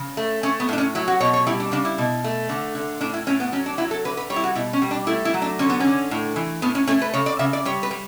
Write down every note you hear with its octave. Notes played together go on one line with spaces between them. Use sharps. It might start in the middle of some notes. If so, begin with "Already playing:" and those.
Already playing: C#3
A3
A3 C#4
B3
A2 D4
C#4
F#3 E4
F#4
B2 C#5
C#5
G3 E4
D4
C#3 D4
E4
B2
A3
D3
D3
A2 D4
E4
A2 C#4
B3
F#3 C#4
D4
F#3 E4
A4
D3 B4
B4
G3 C#5
E4
F#4
B2 E4
C#4
G3
D4
A3 E4
E4
F#3
D4
D3 C#4
B3
D3 C#4
A2
E3
A2 B3
C#4
A3 C#4
B4
C#3 C#5
D5
C#3 E5
D5
G3 C#5
B4
G3